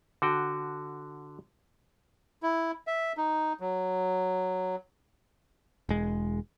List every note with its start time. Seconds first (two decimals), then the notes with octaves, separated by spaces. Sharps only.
0.22 D3 F#4 G5
2.43 E4
2.87 E5
3.17 D#4
3.60 F#3
5.89 E1 G#3